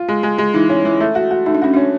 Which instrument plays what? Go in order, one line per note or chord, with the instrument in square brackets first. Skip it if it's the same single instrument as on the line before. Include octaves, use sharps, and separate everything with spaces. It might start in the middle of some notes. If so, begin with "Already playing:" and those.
Already playing: [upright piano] F4
G#3
G#3
G#3
[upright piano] E3 [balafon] D#4
[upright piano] C#4
E3
A3
F#4
F#4
[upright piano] A3 [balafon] D#4
[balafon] D4
[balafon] C#4 [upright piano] F#4
[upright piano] C#4 [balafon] D4